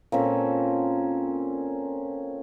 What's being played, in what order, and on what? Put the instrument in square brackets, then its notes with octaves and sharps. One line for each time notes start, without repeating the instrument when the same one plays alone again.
[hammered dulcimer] A#2 C4 C#4 A4